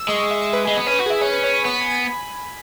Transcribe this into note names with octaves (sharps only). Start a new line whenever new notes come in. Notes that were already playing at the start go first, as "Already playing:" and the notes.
Already playing: E6
G#3 C#6
E5
E5
B4
G#3 G#4
B3 B4
C#4 B4
F#4
E4 G#4
C#4 G#4
B4
C#5
B5
B3 C#6
B5
G#5
B5